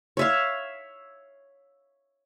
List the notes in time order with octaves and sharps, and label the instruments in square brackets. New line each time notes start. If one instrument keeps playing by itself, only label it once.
[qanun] C#5 E5 F5